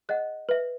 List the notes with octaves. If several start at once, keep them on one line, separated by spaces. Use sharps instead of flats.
G#4 D#5 F#5 F#6
B4 E5